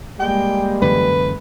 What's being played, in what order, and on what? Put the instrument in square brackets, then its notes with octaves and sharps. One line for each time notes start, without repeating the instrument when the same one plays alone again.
[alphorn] G3 [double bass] G#3 A#3 [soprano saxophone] G5
[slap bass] F#2 D3 E3 [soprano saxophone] B4